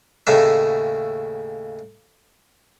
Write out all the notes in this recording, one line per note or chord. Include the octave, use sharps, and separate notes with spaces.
D#2 A2 C#3 A3 E5